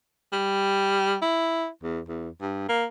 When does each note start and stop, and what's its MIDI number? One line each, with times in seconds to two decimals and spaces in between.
0.33 1.16 55
1.22 1.68 64
1.83 2.00 40
2.08 2.29 40
2.41 2.64 43
2.69 2.85 58